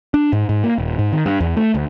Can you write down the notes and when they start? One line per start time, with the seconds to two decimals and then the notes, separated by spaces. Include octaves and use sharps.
0.14 D4
0.33 G#2
0.49 G#2
0.63 A#3
0.78 D#1
0.99 G#2
1.12 D#3
1.26 G2
1.40 E2
1.57 A3
1.74 D2